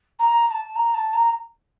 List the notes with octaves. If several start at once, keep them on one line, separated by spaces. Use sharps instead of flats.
A#5
A#5
A5
A#5
A5
A#5